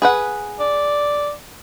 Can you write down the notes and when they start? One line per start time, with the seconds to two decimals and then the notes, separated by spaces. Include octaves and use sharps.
0.02 G#4 B4 F#5
0.60 D5